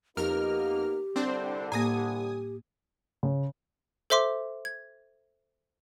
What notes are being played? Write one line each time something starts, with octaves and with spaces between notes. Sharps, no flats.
F2 A#3 B3 D#4 G4 A#4 F6
C2 D3 G3 C4 D4 C5
A2 A#3 G4 G#5 D#6
C#3
A4 C5 E5 C6 D6
G#6